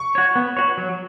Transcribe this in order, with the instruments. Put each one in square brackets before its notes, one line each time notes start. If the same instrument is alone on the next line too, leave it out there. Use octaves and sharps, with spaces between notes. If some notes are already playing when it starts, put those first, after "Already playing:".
Already playing: [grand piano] C#6
[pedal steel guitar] F#4 C#5
B3
F#4 C#5
F#3